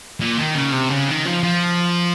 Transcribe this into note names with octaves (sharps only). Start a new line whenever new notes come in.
A#2
D#3
C#3
C3
C#3
D#3
F3
F3